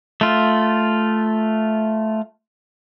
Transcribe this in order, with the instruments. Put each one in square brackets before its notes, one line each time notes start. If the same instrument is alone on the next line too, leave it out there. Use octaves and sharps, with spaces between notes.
[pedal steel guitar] A3 F4